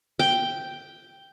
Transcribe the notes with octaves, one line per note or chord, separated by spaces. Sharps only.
G5